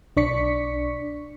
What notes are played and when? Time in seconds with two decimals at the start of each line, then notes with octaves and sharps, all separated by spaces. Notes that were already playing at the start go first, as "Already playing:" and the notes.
0.17 B1 D4 D5 C#6 B6 C#7